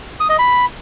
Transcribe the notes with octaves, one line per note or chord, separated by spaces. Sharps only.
D#6
D#5
B5